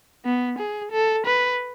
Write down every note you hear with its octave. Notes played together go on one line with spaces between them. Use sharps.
B3
G#4
A4
B4